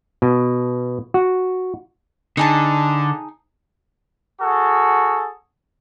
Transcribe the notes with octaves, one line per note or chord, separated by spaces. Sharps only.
B2
F#4
D3 D#4 G#4 A5
F#4 G#4 A4